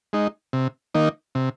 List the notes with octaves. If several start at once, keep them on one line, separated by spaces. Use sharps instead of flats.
G#3 D#4
C3
D#3 A#3 D#4
C3